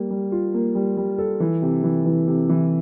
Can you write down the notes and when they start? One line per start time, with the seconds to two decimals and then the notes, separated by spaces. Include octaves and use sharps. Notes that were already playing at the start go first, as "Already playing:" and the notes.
Already playing: G3 A#3
0.11 G3
0.32 F4
0.54 A#3
0.75 G3
0.97 G3
1.18 A4
1.40 E3
1.62 C3
1.84 E3
2.06 E3
2.28 C3
2.49 E3